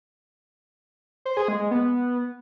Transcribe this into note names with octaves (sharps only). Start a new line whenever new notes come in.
C5
G#4
G#3
G#3
B3